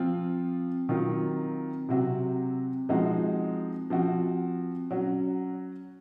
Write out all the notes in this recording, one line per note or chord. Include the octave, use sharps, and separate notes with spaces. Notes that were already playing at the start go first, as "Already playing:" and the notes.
Already playing: F3 C4 F4
D#3 F#3 C4 F4
C3 F#3 C4 F#4
F3 G#3 C4 D#4 F#4
F3 C4 F#4
F#3 C#4 F#4